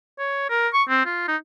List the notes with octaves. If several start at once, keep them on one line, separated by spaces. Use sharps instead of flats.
C#5
A#4
C#6
C4
F4
D#4